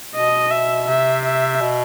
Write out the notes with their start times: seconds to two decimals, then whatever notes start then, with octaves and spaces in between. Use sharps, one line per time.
0.14 B2 D#5
0.51 E5
0.88 C3 E5
1.25 E5
1.61 B2